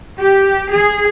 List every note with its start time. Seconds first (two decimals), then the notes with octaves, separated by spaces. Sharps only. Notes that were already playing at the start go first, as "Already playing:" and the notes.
0.20 G4
0.71 G#4